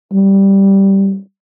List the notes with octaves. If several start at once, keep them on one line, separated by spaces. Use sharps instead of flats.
G3